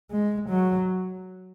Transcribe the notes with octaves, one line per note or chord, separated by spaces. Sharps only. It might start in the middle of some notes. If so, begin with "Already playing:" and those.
G#3
F#3